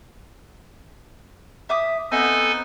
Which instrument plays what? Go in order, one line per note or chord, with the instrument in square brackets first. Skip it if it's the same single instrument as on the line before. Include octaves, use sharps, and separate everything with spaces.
[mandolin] E5 D6 D#6
[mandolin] B3 C4 D#4 [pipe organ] A4 G#5